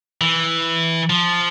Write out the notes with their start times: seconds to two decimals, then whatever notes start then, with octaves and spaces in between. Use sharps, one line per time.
0.21 E3
1.10 F3